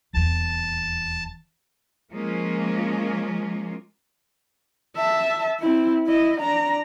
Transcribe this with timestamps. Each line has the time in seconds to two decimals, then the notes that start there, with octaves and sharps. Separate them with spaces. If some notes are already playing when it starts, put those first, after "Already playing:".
0.14 D#1 E2 A5
2.11 F3 G#3 A#3 C#4 F4
4.96 E5 A5
5.60 C4 E4
6.06 E4 D#5
6.41 D4 A#5